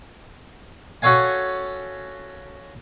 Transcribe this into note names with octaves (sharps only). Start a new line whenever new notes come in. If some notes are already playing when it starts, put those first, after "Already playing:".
C#4 F#4 A4 C#5 F5 G#5